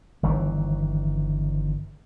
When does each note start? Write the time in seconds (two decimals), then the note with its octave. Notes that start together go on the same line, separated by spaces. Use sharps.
0.23 G1 D#3 E3